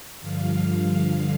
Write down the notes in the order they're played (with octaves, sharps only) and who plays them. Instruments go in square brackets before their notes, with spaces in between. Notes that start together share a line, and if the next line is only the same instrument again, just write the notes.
[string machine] G2 D3 F3 F5